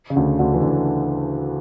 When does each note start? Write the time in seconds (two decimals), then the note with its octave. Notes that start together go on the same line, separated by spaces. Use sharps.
0.10 C#3
0.16 D2 D3
0.39 D2 D3
0.54 E3
0.62 D2 D3